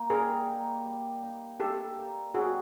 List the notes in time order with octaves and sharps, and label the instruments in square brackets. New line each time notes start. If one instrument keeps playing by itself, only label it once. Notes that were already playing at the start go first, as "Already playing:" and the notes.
Already playing: [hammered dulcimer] A#3 D#4
[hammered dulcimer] G3 [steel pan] G#4 A#4
[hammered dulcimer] A#3 D#4
G3
A#3 D#4
[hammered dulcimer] G3 [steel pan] G4 A4
[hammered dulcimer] A#3 D#4
[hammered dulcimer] C3 [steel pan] F#4 G#4